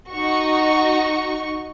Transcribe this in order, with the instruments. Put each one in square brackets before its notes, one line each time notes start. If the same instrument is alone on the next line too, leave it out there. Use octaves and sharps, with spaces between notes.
[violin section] D#4 F#4 C#6